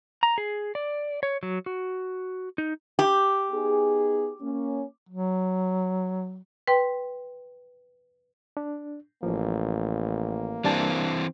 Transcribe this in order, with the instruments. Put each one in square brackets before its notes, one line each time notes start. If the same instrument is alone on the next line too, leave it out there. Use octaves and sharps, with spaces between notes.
[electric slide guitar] A#5
G#4
D5
C#5
F#3
F#4
D#4
[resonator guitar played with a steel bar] G4
[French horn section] B3 D#4 G#4
A#3 C#4
[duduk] F#3
[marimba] B4 G5 C6
[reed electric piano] D4
[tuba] A1 [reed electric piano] F3 [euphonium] A#3
[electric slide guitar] E3 C4 [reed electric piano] G3 D4 A5